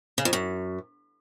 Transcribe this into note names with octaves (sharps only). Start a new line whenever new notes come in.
C#3
F2
F#2